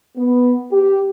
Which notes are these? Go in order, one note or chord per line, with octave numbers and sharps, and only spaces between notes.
B3
G4